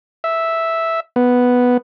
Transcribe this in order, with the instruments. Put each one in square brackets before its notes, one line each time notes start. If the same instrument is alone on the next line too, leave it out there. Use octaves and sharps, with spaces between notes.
[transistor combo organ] E5
B3